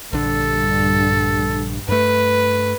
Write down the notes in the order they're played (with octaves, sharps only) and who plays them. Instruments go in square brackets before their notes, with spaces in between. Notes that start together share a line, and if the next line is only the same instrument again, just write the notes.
[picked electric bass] A#1 D3 [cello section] G2 [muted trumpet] A4
[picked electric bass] G2 A3 [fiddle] B4